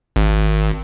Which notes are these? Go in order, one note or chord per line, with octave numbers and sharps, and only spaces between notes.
G#1